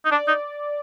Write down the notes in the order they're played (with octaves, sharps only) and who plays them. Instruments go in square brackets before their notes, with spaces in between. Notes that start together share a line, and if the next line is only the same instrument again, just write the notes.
[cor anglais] D#4
[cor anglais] D4 [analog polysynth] D5
[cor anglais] D#4